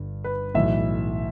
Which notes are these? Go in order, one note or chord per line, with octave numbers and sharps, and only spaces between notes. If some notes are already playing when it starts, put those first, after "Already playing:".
Already playing: G1 G2 D3
B4
B1 A2 E3 E5